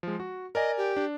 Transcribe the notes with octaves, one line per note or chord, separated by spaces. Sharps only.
F3 G#3
F#4
A#4 D5 D#5 G#5
G4
D4